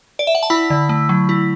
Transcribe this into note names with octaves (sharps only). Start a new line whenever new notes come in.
D5
E5
F#5
A5
E4 F#5 B5
D3
A3
F#3
E4